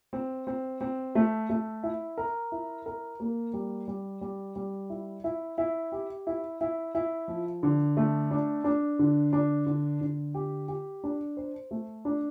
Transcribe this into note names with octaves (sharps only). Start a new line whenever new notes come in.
C4
C4
C4
A3
A3
E4
A#4
E4
A#4
A#3
G3
G3
G3
G3
E4
E4
E4
G4
E4
E4
E4
F3
D3
A3
D4
D4
D3
D4
D3
D3
G4
G4
D4
C5
A3
D4